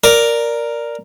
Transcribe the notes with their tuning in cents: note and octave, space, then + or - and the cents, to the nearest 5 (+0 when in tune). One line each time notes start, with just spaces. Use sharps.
A#4 +0 D5 +0